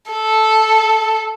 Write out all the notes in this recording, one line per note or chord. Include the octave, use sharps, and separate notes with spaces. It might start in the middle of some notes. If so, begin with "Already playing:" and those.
A4